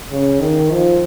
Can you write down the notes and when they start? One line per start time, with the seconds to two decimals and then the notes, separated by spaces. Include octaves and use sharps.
0.12 C#3
0.41 D#3
0.71 F3